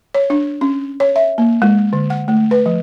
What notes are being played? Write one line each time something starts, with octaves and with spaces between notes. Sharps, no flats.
C#5
D4
C#4
C#5
E5
A#3
G#3
D3
F#5
A3
B4
F3